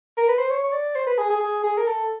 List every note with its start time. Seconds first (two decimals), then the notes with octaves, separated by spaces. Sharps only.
0.18 A#4
0.29 B4
0.39 C5
0.50 C#5
0.64 C#5
0.73 D5
0.95 C5
1.07 B4
1.18 G#4
1.30 G#4
1.40 G#4
1.64 G#4
1.77 A#4
1.87 A4